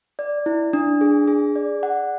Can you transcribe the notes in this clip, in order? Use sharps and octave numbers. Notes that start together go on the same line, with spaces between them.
D5
E4
D4
G#4
G#4
D5
F#5